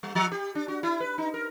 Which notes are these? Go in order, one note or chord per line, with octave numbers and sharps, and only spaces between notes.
G3
F3
G4
D4
F#4
E4
B4
D#4
A#4